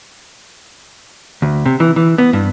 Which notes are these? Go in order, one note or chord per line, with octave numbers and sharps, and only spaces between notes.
D2
C3
E3
E3
B3
G2